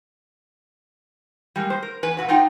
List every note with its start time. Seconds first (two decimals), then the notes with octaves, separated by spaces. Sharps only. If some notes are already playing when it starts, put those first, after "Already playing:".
1.56 G3 G#3 A#3
1.70 C5
1.83 A#4
2.03 E2 B4 G#5
2.17 A#2 C#3 F#4 B4
2.28 D4 D#4 F4 F#5 G5